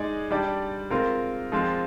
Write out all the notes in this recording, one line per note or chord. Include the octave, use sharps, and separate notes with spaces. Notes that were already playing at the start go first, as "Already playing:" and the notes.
Already playing: G#3 D#4 G#4 D5
G3 D4 G4 D5
G#3 C4 F4 A#4
F3 G#3 C4 F4